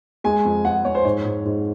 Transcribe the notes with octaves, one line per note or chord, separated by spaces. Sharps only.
G#3 G#5
F2
G#3 F#5
F2 C#5
C5
G#2 C#5
G#2
G#2